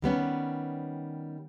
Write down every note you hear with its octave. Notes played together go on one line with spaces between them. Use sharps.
D#3 G3 B3 C#4